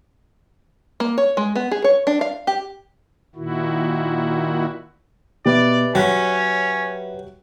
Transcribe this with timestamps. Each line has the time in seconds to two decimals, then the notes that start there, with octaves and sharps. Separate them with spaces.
1.00 A#3
1.18 C#5
1.37 G#3
1.55 B3
1.71 G#4
1.84 C#5
2.07 D4
2.21 F5
2.47 G4
3.35 A#2 D#3 E4 F#4
5.46 B2 G4 B4 D5 E5
5.95 F#3 C#4 G5 F#6 B6